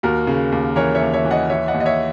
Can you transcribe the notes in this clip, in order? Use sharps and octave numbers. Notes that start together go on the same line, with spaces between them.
D#2 F#4 A#4
C#3
D#2
E3 A#4 C#5
C#5 E5
D#2
C#5 E5
E3
D#5 F#5
E3 C#5 E5
D#5 F#5
D#2
D#5
C#5 E5